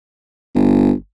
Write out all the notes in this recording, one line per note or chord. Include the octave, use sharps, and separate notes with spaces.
G1